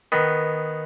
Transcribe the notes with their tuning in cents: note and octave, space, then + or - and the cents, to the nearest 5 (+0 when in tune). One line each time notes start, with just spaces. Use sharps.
D#3 +0 B3 +0